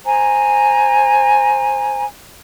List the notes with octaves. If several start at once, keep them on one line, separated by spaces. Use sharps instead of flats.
C5 G#5 A#5